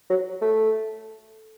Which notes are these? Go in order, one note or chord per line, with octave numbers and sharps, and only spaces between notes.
F#3
A3